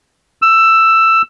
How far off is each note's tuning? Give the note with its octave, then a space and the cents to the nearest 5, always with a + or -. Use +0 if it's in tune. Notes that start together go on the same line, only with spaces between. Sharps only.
E6 +10